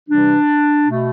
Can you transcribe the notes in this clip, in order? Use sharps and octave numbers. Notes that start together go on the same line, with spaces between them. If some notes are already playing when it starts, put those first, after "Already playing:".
C3 E3 G3 D4
B2 A3